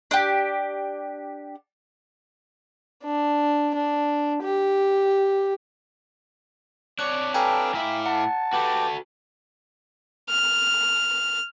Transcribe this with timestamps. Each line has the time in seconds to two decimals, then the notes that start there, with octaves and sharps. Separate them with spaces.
0.11 D4 G4
3.04 D4
3.75 D4
4.43 G4
6.99 D4 C#5 D5 F#6
7.34 G4 A4 B4 F5 G5 G#5 A#5
7.74 A2 E4 E5 F5 D6
8.06 F#5 A5
8.53 F#4 G4 A4 B4 G5
10.30 F6